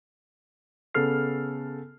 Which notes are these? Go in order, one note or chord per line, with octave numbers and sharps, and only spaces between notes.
C#3 B3 A4 F6 C7